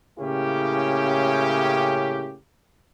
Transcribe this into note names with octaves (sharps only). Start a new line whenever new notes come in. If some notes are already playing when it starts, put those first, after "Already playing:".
A2 C#3 A#3 C#4 E4 G4